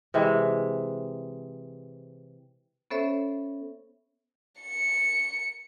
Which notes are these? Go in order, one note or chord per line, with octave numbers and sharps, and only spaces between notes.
C3 E3 G#3
B3 C#4 A4 C5 C#5 E5
C#7